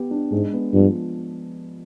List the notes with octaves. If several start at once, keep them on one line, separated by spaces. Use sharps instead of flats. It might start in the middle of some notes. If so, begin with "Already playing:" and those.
Already playing: B3 G4
D4
G#2 G#3
B3
G2 F3